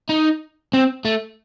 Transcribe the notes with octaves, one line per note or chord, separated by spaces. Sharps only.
D#4
C4
A3